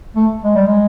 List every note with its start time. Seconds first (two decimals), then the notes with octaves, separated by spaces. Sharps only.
0.16 A3
0.44 G#3
0.55 G3
0.67 G#3